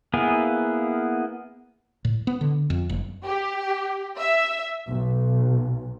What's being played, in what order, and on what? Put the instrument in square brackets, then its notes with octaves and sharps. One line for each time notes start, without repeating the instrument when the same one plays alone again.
[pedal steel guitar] A#3 B3 E4 G#4
[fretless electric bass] A2
B3
D3
F2
F#1
[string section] G4
E5
B1